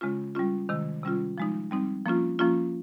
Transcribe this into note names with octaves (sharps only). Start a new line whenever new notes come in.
C#3 G#3 C#4 F4
G3 C#4 F4
C3 D#3 G#3
C3 G3 C#4 F4
F3 G#3 D#4
G3 C4 D#4
F3 A#3 C#4 F4
F3 A#3 C#4 F4